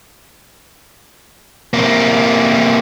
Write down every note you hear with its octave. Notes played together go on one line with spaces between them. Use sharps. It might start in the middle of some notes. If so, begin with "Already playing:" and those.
C3 A#3